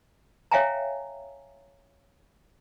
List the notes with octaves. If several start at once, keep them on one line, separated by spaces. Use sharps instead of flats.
C#5 E5 F5 G5 G#5 A#5